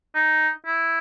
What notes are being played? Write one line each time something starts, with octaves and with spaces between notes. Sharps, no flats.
D#4
E4